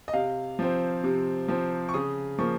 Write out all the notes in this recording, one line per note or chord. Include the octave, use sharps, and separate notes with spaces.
D#5
C3 F5
F3 C4
C3
F3 C4
C#6
C#3 D#6
F3 A#3 C#6